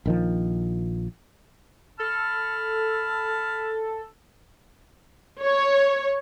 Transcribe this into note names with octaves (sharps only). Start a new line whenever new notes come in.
A#1 D#3 F3
A4 A5 B5 F6
C#5